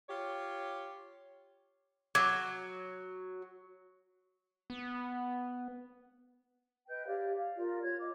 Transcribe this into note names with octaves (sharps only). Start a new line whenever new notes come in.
F4 G4 C#5
F#3 D6 G#6
B3
B4 D#5 G5 G6
G4 C#5 D5 F5
F5
F4 A#4 D5
F4 C#5 G#6
F4 D#5 D6